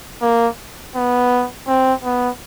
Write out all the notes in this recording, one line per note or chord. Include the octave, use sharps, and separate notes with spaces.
A#3
B3
C4
B3